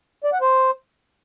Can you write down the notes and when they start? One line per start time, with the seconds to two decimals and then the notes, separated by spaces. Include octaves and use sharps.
0.24 D5
0.33 F#5
0.41 C5